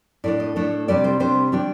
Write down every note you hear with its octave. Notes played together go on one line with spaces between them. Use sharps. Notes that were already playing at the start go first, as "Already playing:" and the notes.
A2 A3 D4 D5
D#5
A2 A3 D4
C3 G3 D4 D5
C5
C3 G3 D4 C5
D#3 G3 D4 G4